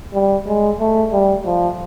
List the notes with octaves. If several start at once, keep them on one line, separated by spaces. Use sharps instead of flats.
G3
G#3
A3
G3
F3